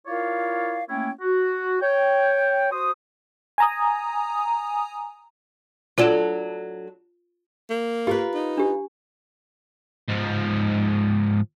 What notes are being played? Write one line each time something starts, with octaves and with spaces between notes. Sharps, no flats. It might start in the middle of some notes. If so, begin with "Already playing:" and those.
E4 F4 A#4 C#5 D5 F5
A3 A#3 C#4 E4 C#5 G5
F#4
C#5 G5
F#4 C5 D#6
G#5 A#5 D#6
F#3 D4 F4 A4
A#3
F4 G4 A#4 B4
D#4
D4 G4
G#2 F3